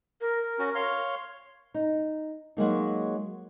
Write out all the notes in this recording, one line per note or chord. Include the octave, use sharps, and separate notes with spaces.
A#4
C#4 F#4
C#5 F5 C6
D#4
F#3 G#3 A#3 D#4